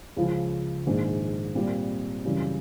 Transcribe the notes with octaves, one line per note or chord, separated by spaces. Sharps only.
C#2 C#3 F3
A#1 G#2 D#3
A#2 G3 C4
F#2 C#3 E3 G3